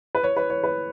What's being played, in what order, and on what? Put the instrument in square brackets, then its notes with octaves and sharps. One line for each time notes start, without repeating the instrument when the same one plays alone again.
[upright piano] B4
C#5
B4
C#5
B4